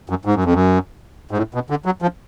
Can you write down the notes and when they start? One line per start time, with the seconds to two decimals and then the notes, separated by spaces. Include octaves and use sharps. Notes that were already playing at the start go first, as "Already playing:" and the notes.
0.10 F#2
0.25 G#2
0.35 F#2
0.44 F2
0.53 F#2
1.31 G#2
1.37 A2
1.54 B2
1.70 D3
1.86 F#3
2.02 F3